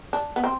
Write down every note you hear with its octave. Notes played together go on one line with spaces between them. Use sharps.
D4
B3
C4